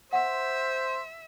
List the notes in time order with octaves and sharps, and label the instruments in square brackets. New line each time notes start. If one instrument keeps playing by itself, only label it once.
[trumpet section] C5 [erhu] E5 [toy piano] F#5